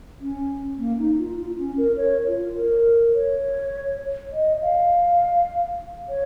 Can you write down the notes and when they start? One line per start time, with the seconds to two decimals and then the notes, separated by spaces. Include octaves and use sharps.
0.20 C#4
0.79 A#3
0.98 D#4
1.18 F4
1.38 F4
1.58 C#4
1.78 A#4
1.97 C#5
2.27 F4
2.56 A#4
3.15 C#5
4.32 D#5
4.62 F5
6.09 C#5